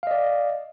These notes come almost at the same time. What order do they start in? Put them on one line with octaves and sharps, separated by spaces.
F5 D#5 D5